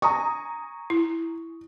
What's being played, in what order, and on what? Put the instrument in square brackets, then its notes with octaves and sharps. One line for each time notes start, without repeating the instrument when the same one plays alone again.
[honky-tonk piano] G#5 A#5 [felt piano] C#6 D#6
[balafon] E4